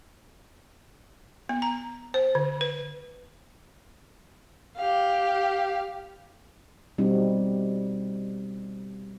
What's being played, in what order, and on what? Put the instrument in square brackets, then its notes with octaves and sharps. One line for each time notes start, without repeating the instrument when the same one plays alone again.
[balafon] B3
A#5
C5
D3
B4
[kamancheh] G4 F5
[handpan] B2 G3 C4 D#4 F#4